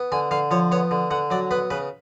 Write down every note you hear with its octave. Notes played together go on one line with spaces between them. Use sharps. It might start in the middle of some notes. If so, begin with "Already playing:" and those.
Already playing: B3
D3 G#5
D3 F5
F3 C#5
B3 C#5
D3
D3 F#5
F#3 D5
B3 B4
C#3 B4